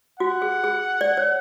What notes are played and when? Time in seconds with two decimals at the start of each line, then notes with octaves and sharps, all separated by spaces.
0.20 F#4 F#5
0.42 G#4
0.64 G#4
1.01 D5
1.17 C#5